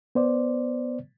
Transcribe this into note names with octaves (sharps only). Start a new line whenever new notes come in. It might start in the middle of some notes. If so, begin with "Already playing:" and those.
B3 C5 D5